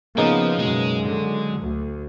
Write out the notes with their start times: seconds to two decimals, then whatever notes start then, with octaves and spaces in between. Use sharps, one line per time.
0.18 C#3 F3 A#3 B3 D#4
0.60 F#2 B2 G#3
1.04 D3 F#3
1.61 D2